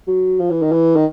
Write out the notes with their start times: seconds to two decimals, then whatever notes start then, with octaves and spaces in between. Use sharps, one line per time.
0.07 F#3
0.40 F3
0.51 E3
0.62 D#3
0.72 E3
0.96 D#3